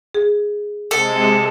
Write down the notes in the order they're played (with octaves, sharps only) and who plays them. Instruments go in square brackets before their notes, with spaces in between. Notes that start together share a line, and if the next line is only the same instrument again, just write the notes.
[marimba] G#4
[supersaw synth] C3 G#3 [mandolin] A4